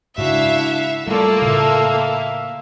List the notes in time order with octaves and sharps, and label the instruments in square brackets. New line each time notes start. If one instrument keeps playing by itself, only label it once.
[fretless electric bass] G#2 C#3 [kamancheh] D4 [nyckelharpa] E4 F#4 [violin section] E5 F5
[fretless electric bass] G3 [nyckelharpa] A3 D5 [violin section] A#3 [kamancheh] F4 A4
[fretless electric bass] A2 C#3 [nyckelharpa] E5 F5